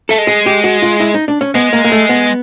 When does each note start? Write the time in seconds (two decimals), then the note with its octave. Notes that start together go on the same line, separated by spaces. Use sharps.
0.09 A3 A4
0.18 G#3
0.27 G#4
0.46 G4
0.64 F#4
0.82 F4
1.00 E4
1.14 D#4
1.28 D4
1.41 C#4
1.55 G#3 B3
1.73 A#3
1.84 A#3
1.92 A3
2.09 B3